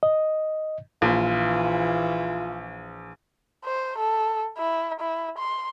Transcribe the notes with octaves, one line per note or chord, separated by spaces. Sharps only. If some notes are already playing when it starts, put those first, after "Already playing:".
D#5
A#1 E3 F4
C5
A4
E4
E4
C6